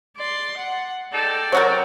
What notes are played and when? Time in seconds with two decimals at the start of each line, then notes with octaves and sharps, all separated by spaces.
0.17 D5 C6
0.57 F#5
1.12 G#3 D#4 A4 D5 G5
1.52 C3 F#3 F#4 A#4 C5 C#5 D#5